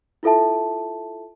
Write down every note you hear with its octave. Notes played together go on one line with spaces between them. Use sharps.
E4 F4 A4 E5 A5